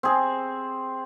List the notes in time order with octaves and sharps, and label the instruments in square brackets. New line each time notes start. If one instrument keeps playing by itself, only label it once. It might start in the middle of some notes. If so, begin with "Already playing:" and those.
[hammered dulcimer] C4 G#4